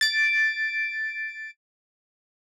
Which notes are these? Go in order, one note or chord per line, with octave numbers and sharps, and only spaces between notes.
A6 D7